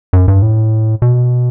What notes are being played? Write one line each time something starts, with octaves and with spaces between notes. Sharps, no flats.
F#2
G2
A2
B2